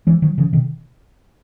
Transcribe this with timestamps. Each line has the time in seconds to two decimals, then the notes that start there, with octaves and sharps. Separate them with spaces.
0.07 E3 G#3
0.22 D#3 F#3
0.38 C#3 E3
0.53 B2 D#3